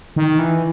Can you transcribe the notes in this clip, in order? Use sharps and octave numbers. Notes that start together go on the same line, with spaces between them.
D#3
E3